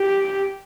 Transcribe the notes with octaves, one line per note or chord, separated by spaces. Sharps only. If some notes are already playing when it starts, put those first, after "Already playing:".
Already playing: G4